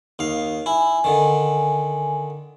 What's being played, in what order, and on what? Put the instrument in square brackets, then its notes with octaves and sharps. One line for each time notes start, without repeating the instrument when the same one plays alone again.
[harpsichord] D#2 F5 [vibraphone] D#4
[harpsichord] E4 [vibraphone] G#5
[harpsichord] D3 D#3